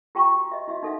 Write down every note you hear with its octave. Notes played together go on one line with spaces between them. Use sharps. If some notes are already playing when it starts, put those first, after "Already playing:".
F4 G4 G5 A5 A#5 C#6
F#4
D#5 E5
E4 F#4 E5
D#4 A4 E5 F5